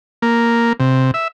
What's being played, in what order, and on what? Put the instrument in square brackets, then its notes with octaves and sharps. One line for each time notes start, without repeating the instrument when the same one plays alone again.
[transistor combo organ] A#3
C3
E5